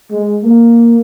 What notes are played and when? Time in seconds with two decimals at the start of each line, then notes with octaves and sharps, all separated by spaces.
0.11 G#3
0.43 A#3